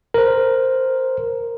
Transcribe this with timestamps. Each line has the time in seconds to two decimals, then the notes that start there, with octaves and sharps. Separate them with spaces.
0.14 A#4 C5